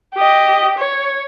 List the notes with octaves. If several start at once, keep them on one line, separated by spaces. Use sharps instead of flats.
G4 D#5
C#5